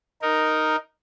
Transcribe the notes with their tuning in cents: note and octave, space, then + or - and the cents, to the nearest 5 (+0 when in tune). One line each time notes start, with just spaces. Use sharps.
D#4 +0 A#4 +0